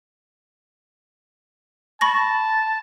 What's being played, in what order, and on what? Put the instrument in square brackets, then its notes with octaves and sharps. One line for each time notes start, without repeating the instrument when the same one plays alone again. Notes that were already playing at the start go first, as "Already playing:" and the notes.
[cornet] A5 [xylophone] B5 C#6 A#6